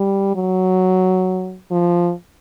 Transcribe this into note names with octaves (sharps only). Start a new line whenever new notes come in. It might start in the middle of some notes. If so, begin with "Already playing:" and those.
Already playing: G3
F#3
F3